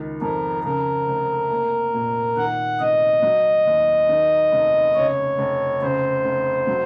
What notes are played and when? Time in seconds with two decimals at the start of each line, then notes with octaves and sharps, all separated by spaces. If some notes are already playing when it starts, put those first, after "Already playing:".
Already playing: C#2 D#3
0.21 F2 A#4
0.64 C#3 A#4
1.07 F1
1.51 A#3
1.94 A#2
2.36 D#3 F#5
2.80 F1 D#5
3.22 F#3
3.66 D#2
4.09 D#3
4.52 F1
4.95 C#3 C#5
5.38 F1
5.82 C#3 C5
6.25 F1
6.67 F#3